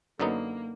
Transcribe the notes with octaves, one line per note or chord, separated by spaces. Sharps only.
F#2 D3 F#3 A#3 B3 D#4